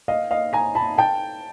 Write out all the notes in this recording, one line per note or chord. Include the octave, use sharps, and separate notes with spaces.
D#5 F5
D#5 F5
G#5 A#5
A5 B5
G5 A5